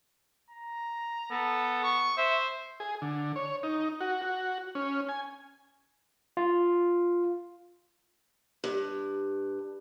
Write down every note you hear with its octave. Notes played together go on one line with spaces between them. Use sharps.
A#5
B3 A4
C#6
C5 E5
G#4
D3
C#5
D#4
F#4
F#4
C#4
G#5
F4
G2